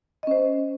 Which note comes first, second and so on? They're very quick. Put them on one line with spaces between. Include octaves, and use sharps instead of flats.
D#5 C#4 C5